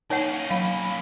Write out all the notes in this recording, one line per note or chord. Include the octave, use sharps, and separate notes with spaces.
A#3 C#4 D#4 C#5 F#5
F#3 F5 B5